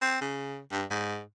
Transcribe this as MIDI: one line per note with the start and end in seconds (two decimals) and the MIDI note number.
0.01 0.18 60
0.21 0.59 49
0.72 0.84 43
0.91 1.22 44